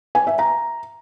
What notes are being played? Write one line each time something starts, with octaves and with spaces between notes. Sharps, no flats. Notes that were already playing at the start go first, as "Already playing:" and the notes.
G#5
E5
A#5